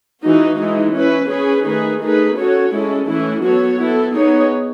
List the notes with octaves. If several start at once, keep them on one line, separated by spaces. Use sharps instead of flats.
E3 G#3 D#4 F#4
E3 G#3 D#4
C#4 E4 B4
C#4 G#4 B4
D#3 A3 D#4 G#4 B4
A3 D#4 G#4 B4
C#4 F#4 A4 C#5
G#3 C#4 E4 A4
E3 A3 C#4 E4
F#3 B3 F#4 A4 C#5
B3 E4 A4
B3 D#4 G#4 C#5